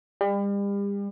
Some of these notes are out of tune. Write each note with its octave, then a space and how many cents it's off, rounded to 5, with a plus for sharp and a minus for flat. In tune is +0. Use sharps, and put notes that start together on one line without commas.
G3 +40